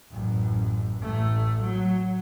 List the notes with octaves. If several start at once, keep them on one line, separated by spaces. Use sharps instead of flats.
A1 F#2
A1 A3
F#3